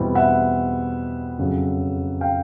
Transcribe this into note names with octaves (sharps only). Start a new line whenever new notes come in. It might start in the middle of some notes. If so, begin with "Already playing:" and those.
Already playing: E2 B2 G3 C4 E4
E5 F#5
F2 C#3 F#3
F5 G5